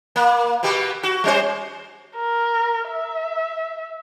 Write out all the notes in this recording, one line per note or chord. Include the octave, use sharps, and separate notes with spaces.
A#3
B2 B3 G4
F#4
G3 C#4 C5
A#4
E5